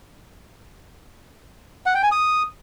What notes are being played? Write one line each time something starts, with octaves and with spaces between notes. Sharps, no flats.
F#5
G5
G#5
D#6